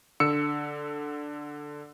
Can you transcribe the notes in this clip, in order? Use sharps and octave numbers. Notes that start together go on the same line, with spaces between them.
D3 E6 C#7